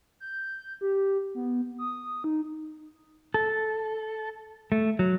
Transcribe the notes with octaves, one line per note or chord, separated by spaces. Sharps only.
G6
G4
B3
D#6
D#4
A4
A3
F#3